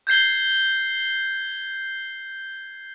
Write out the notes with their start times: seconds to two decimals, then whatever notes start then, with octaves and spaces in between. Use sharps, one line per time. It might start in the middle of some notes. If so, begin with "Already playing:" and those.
0.07 G6 G#6 C7 G7